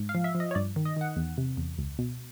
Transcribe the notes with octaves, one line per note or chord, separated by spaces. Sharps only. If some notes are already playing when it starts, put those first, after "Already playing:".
Already playing: G#2
F5
F3
E5
F3
D#5
C#5
G2 D5
D#3
D#5
D#3 F#5
E2
C3
E2
C#2
B2